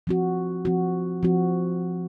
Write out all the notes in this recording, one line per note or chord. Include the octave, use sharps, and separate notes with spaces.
F3 C4 F#4
F3 C4 F#4
F3 C4 F#4